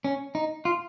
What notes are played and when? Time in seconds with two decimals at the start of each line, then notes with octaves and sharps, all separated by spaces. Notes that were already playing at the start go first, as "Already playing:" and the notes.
0.04 C#4
0.35 D#4
0.65 F4